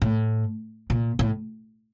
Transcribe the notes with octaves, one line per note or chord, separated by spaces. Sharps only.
A2
A#2
A2